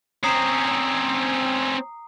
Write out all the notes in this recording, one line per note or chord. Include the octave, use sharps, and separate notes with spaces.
C4 C#4 A#5 D#6 C7